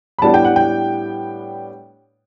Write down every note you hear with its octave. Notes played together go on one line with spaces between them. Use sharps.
B5
A2 G3 B3 D4 A5
G5
F#5
G5